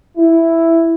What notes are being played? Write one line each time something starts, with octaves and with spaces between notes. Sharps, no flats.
E4